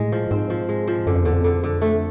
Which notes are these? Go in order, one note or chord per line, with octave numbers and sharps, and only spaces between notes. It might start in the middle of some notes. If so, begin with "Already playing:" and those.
Already playing: A2 G#3
F3
G#2 C4
F3
G#3
F3
F#2 D3
F2
E2 D3
F2
D3
D3
A3